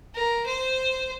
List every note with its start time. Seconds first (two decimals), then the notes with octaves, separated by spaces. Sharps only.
0.15 A#4
0.46 C5